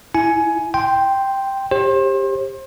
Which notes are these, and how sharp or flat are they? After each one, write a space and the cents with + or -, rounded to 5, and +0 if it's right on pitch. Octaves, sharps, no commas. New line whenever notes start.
E4 +0 G#5 +15
G5 +0 C6 +0
G4 +15 C5 +35